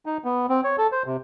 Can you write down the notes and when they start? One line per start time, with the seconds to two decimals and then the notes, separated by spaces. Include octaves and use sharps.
0.06 D#4
0.25 B3
0.49 C4
0.64 C#5
0.78 A4
0.92 C5
1.06 C3